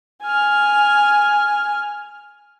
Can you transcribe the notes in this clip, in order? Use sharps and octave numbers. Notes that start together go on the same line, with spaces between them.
G#5 F6